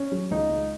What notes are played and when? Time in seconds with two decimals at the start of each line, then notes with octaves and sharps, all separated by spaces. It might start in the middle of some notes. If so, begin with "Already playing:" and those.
Already playing: C#4
0.12 F#3
0.31 C#2 D#4
0.50 C#2